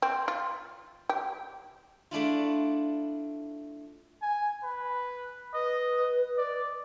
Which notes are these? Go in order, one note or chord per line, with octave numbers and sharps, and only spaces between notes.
C4
F4
G4
A3 D4 E4 F4
G#5
B4
B4 D#5
D5